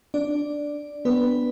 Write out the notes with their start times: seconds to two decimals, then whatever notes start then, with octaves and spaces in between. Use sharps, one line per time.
0.14 D4 D5
1.05 B3 B4